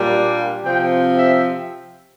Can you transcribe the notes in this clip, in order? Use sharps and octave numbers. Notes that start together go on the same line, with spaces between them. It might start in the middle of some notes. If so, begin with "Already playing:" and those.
Already playing: A#2 G3 A#3 D4
C3 F3 C4 G5
E5